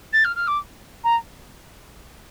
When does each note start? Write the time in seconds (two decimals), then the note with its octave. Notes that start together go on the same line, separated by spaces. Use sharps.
0.13 A6
0.24 F6
0.36 F6
0.47 D6
1.04 A#5